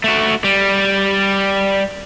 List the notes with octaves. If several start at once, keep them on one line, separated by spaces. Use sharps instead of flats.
A3 F#4
G3